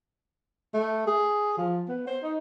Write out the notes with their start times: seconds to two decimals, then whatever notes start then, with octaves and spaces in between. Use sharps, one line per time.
0.74 A3
1.07 G#4
1.57 F3
1.89 B3
2.07 C5
2.23 D#4